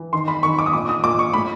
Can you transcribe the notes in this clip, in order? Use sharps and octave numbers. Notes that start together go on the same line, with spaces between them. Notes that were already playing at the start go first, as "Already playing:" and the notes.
Already playing: E3
D#3 C6
B5
D#3 C#6
D6
D#6
A#2 D6
D#6
A#2 D6
C#6
A2 B5